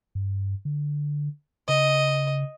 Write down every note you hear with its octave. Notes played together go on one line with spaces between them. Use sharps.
G2
D3
C#3 D#5